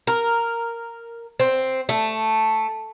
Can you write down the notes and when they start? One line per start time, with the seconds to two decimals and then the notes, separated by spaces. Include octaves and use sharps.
0.07 A#4
1.40 C4
1.89 A3